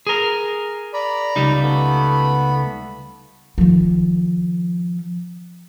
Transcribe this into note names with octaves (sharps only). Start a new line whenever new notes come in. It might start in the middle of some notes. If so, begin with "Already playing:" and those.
G#4 A#4
D5 A#5 B5
C#2 G3 D#4
A3 B3 B5
D#3 F3